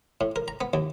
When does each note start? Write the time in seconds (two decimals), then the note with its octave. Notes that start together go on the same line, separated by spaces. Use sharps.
0.21 A2
0.36 A#4
0.48 A#5
0.61 B3
0.73 D#2